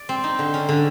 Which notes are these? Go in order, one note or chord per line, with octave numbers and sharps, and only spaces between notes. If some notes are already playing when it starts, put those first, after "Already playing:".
Already playing: D5
C4
D#4
D3
C#4
D3